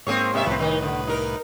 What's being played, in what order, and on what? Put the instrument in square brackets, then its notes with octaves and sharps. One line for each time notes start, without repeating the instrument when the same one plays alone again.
[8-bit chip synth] G#2 A#3 [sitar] C4 G#4 C#5
[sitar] C3 G#3 E5
[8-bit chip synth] C2 A2 B4 [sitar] F3 C4
[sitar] D#3 D#4
D3
D#4 A#4